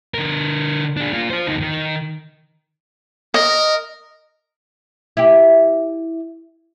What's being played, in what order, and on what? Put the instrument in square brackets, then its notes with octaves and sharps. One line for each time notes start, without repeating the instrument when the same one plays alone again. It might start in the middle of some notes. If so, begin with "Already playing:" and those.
[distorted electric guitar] D3 A#4
D4 G#4
A#3 F4
F4 C5
D2 D#4
D#3
[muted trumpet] A#4 [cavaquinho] D#5
[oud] E4 G4